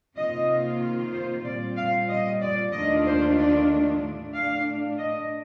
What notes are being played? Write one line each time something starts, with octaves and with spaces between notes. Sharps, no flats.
C3 D#3 A#3 F4 D#5
C5
A#2 G3 C4 F4 D5
F5
D#5
D5
D#2 D#3 A3 D4 F4 D#5
C5
D5
A2 A3 D4
F5
D#5